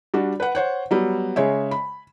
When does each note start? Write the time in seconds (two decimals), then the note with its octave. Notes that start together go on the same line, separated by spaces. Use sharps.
0.14 G3 D4 F#4
0.40 B4 F#5
0.55 C5 C#5 F#5
0.91 F#3 G3 B3
1.36 C#3 G#3 C#5 E5
1.71 B5